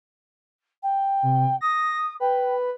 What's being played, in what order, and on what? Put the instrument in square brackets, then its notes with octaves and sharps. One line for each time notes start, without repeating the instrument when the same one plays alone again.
[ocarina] G5
[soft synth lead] C3
[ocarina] D#6 [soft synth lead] A#6
[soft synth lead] B4 [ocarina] G5